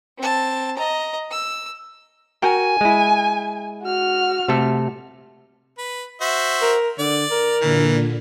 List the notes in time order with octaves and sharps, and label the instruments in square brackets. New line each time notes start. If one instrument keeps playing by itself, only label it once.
[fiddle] C4 A5
D#5 A#5
E6
[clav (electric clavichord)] F#4 A#4 G5 [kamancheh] G#5
[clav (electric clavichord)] G#3 E4
[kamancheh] F#4 F6
[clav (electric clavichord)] C3 A3 A4
[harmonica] B4
F#4 C5 E5
[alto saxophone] A#4
[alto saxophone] D3 [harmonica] D5
[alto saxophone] A#4
[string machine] A#2 D3 [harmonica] E3